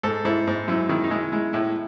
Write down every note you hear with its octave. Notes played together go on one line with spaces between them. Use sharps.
G#2 A4
G#2 E4
G#2
F#2 E4
D#3 E4
D#4
G#3 E4
G#3 E4
A2 E4